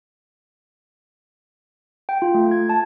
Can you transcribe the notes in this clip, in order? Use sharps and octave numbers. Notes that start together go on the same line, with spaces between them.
G5
F4
A3
G#6
A5